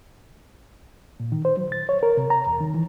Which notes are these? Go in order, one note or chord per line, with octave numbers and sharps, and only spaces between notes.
A#2
D#3
C5
F#3
A6
C#5
A#4
C3
A#5
E2
D#3
E3